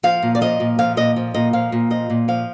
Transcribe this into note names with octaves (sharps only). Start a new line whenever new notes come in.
F3 F5
A#2
D5
F3 D#5
A#2
F3 F5
A#2 D#5
F3
A#2 D#5
F3 F5
A#2
F3 D#5
A#2
F3 F5